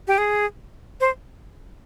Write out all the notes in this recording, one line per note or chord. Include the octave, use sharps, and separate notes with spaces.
G4
G#4
C5